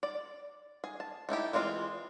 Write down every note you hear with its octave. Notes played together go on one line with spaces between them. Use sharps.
D5
G#4
A5
A3 D#4 E4 G4
E3 G#3 C4 D4 F4